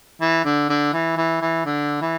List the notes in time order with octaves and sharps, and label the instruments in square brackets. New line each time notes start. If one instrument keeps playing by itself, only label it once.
[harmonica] E3
D3
D3
E3
E3
E3
D3
E3